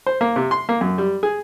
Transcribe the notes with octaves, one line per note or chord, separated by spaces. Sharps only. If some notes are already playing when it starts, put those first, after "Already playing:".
C5
A#3
C3
C6
A#3
F#2
G3
G#4